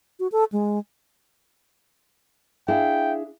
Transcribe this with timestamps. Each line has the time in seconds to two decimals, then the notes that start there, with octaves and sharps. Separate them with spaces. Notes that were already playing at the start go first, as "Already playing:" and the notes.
0.19 F#4
0.32 A4
0.52 G#3
2.68 D4 E4 G#4 E5 F5 G5